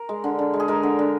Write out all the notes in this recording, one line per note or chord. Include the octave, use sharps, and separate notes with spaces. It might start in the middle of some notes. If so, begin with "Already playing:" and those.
Already playing: A#4
G#3
D3
D3
G#3
G#4
G#3 A#4
D3
D3